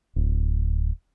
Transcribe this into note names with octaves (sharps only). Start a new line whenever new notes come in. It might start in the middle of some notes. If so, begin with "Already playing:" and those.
D1